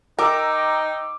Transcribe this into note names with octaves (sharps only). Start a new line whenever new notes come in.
D#4 A#4 G5 A#5 D6 E6